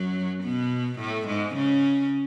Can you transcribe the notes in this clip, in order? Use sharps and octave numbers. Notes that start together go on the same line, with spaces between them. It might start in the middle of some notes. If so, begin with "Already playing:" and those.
Already playing: F#2 F#3
B2 B3
A2 A3
G#2 G#3
C#3 C#4